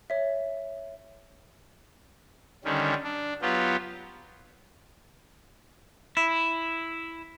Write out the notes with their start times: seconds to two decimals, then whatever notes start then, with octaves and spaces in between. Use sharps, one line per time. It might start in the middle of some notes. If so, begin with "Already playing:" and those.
0.10 C#5 E5
2.65 D3 D#3 G3 C#4
3.04 D4
3.42 F#3 B3 F4 G4
6.17 E4